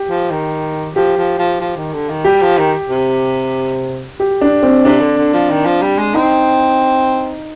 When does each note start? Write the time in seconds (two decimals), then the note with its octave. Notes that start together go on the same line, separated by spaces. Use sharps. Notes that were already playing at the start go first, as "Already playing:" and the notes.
Already playing: G4
0.09 F3
0.30 D#3
0.95 F3 G4
1.16 F3
1.38 F3
1.60 F3
1.76 D#3
1.93 D3
2.09 D#3
2.24 G3 G4
2.42 F3
2.58 D#3
2.90 C3
4.20 G4
4.41 D4
4.63 C4
4.85 C3 D4
5.01 D3
5.17 D3
5.33 F3
5.50 D#3
5.65 F3
5.81 G3
5.98 G#3
6.14 C4 D#4